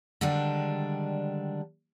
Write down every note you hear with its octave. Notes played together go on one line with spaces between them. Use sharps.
D3 D#3 G3 G#3 D4